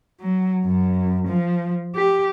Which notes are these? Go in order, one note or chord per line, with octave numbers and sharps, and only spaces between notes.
F#3
F#2
F3
G4